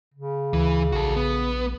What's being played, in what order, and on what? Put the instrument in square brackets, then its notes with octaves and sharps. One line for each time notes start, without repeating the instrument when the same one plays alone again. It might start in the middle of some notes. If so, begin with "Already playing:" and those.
[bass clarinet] C#3
[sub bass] D2 [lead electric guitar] E3
[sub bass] A#1 [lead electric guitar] F#4 A4
[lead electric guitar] B3